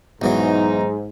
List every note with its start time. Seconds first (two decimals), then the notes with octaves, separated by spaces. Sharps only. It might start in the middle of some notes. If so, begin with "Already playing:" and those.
0.22 B1 G#2 E3 F#3 D#4